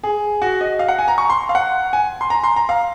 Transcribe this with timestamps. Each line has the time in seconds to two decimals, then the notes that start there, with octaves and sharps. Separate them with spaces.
0.04 G#4
0.42 F#4
0.61 D#5
0.79 F5
0.88 F#5
0.99 G#5
1.08 A#5
1.18 C#6
1.30 C6
1.49 F5
1.55 F#5
1.93 G#5
2.21 C6
2.30 A#5
2.44 C6
2.56 A#5
2.69 F5